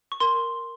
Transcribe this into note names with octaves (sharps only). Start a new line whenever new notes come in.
C#6
A#4 C6